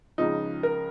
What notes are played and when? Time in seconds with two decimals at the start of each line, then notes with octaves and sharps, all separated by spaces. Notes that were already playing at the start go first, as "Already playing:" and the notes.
0.18 C#2 C#3 F3 D#4
0.63 A#4